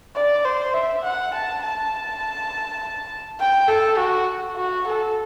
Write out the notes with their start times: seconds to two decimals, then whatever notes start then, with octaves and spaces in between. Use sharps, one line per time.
0.16 D5
0.45 C5
0.74 E5
1.04 F#5
1.34 A5
1.63 A5
3.40 G5
3.68 A4
3.98 F#4
4.56 F#4
4.87 A4